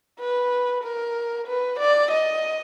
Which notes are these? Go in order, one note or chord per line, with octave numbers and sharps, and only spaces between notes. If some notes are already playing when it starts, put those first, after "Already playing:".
B4
A#4
B4
D5
D#5